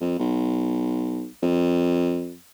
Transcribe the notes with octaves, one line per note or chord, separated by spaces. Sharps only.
F2
B1
F2